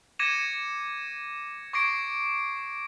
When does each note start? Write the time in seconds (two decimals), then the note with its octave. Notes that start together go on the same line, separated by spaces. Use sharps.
0.19 D6 G#6 A#6 C#7 D#7 E7
1.73 C#6 D6 G#6 A#6 C7 D7